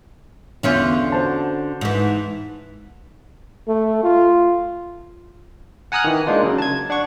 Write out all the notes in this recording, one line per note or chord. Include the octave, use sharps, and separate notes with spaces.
E2 D3 C#4 F4 E5 G6
F#4 C5 A5
G#2 E3
A3
F4
F#5 G#5 A#5 D#6 F6 F#6
D#3 E3
G#3 A#3 D4 D#4 F4
C#3 F#3
A5 G#6
D4 F#5 C#6